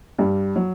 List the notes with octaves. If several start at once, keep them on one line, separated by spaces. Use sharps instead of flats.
G2 G3
F#3